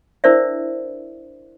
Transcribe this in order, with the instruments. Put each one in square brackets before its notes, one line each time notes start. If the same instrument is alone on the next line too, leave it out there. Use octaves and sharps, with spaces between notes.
[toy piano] D4 E4 A#4 C5 D5 E5